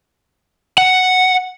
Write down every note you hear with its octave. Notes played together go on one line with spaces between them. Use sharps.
F#5